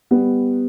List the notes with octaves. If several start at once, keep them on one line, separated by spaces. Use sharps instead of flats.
G3 B3